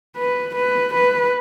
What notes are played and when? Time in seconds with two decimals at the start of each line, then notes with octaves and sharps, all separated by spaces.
0.17 B4
0.56 B4
0.94 B4